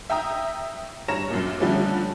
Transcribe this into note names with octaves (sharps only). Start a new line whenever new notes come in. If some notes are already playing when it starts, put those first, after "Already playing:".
E5 G5 A#5 D#6
G2 C#5 A#5 A#6 E7
F#2 A#2
D3 F3 G3 A3 C#4